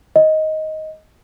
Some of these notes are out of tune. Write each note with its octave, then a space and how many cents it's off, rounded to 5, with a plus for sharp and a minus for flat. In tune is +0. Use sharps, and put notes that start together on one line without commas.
D#5 +10